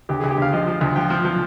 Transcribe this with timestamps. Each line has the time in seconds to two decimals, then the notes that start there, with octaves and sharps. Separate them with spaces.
0.09 D2 G4
0.20 D2 G#4
0.31 G4
0.38 D2 F5
0.53 F3 D#5
0.67 F3
0.81 D2
0.96 F3 G5
1.10 F3
1.25 F3